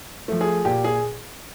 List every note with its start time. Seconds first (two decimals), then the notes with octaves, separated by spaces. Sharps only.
0.28 F3 A3
0.41 G#4
0.65 A#2 G4
0.84 G#4